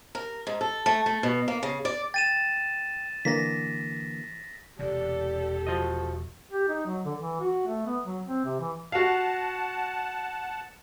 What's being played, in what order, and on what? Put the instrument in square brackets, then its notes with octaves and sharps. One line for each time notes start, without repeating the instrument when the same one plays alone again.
[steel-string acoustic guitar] A#4
G#2
A4
A3
A3
B2
A#3
C#3
D5
[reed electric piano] G5 [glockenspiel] A6 D#7 E7
[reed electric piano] D3 E3 A#3 [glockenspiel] A#6 B6
[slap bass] E1 E2 C3 [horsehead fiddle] G4 A4 [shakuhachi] D5
[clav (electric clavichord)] F3 D#5 [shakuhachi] F#4
[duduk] G4
D#4
F#3
D3
E3
F#4
A3
B3
F#3
C4
C3
E3
[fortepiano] F#4 F5 [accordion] F#5 A5